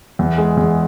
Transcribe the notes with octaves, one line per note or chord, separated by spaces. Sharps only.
E2
G#3
E2